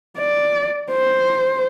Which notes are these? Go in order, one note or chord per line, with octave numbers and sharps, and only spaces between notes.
D5
C5